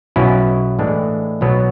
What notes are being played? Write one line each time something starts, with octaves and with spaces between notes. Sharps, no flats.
B1 B2 F#3 C#4 E4
A2 E3 G#3 D4
B1 B2 F#3 B3